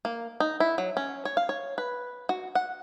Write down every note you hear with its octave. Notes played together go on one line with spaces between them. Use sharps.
A#3
D#4
E4
F#3
C#4
C#5
F5
C#5
B4
F#4
F#5